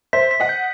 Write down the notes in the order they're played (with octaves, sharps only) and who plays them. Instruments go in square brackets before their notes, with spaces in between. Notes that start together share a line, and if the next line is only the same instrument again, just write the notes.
[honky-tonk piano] C5 E5 [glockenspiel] B6
[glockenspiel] B6
[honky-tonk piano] D#5 F#5
[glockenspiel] G6